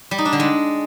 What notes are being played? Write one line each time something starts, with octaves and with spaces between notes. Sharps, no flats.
G3
D#4
D4
D3
G#3